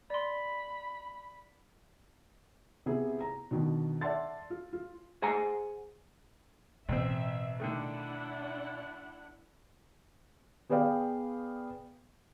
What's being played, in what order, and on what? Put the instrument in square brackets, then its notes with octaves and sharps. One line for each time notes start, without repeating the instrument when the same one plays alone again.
[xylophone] D5 C6 [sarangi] B5
[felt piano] C3 B3 E4 G#4
A#5
B2 D3 D#3
D5 E5 F#5 A5 C6 A6
F4
F4
[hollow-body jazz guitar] G#4 C5 F#5 G#5 A#5
[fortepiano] A1 C4 [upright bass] B2 [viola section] E5
[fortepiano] D3 D#3 A3 [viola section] D4 E4 F#5
[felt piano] B3 G#4 B4 D5 F5 G5